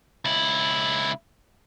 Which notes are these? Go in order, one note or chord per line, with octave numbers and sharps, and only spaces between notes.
C#2 E4